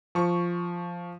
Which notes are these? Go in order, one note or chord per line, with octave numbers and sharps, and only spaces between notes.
F3 C#6